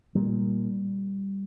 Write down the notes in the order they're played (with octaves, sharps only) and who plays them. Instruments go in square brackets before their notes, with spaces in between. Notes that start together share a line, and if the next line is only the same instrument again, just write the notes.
[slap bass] A#2 G3